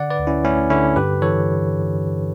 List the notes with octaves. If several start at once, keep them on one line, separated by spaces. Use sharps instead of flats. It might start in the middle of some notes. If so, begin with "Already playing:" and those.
Already playing: D3 D5 F#5
B4 D5
D2
C#4 E4
A3 C#4 E4
D3 C#4 E4
G2 G4 B4
E3 A4 C#5